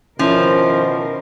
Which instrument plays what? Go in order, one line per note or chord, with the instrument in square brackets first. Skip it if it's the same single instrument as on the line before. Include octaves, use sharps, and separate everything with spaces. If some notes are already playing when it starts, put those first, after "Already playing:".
[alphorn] B2 [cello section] D#3 A#4 C5 [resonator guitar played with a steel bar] F3 [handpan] C#4 E4